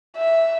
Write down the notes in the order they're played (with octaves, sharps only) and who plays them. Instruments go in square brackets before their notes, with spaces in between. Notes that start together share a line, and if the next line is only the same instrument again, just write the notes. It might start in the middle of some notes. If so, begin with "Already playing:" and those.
[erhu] E5